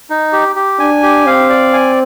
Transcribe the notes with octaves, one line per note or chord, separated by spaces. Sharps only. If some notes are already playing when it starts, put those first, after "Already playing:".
D#4
G4
G4
D4 G#5
G4
C4 F5
D5
G#5